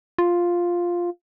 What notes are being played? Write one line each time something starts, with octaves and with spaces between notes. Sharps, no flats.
F4